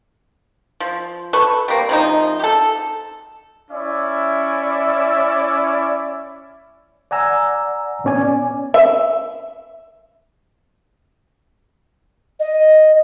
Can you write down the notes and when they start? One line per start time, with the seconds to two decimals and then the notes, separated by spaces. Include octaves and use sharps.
0.80 F3
1.33 A4 B4 C#6
1.68 G3 A#3 C4
1.89 C3 F3 D#4
2.40 G4 A4
3.70 C#4 E4 D5 E5
7.11 D5 F#5 G#5 A#5 E6
8.04 A#2 B3 C#4 D5 G#5
8.74 E5
12.40 D#5